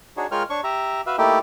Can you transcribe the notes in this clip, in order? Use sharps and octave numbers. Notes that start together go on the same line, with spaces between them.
D4 D#4 F#4 G#4 C#5
G#3 F4 A#4 C#5 G5 F6
D4 C#5 C#6
G4 E5 A#5
F#4 B4 E5 F5
A3 A#3 D#4 E4 G4 G5